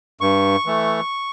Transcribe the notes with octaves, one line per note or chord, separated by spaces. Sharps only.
G2 C#6
E3 A3